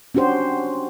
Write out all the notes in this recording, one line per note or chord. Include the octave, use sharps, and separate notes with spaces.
C#4 D4 F#4 G4 C5